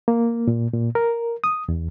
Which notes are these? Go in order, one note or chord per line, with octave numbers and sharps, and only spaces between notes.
A#3
A#2
A#2
A#4
D#6
E2